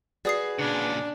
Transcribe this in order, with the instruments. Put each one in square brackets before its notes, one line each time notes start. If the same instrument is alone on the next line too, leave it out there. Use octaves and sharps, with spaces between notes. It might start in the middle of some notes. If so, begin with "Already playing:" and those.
[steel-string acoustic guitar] F#4 G#4 B4 [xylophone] D5 D#6 C7
[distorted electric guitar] A#2 C#3 [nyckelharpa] D4